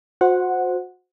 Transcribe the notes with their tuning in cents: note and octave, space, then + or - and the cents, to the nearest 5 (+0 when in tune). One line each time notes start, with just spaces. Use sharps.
F#4 -35 C5 -5 F#5 -10